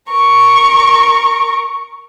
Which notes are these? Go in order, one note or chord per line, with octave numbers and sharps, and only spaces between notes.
A#4 C#6